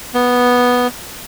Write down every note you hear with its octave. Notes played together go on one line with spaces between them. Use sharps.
B3